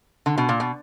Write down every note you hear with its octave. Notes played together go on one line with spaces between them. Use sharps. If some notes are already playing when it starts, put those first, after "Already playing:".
D3
B2
A#2
B2